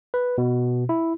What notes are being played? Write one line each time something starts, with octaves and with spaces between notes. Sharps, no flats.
B4
B2
E4